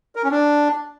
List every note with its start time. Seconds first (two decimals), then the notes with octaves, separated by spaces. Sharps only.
0.15 A#4
0.23 C#4
0.31 D4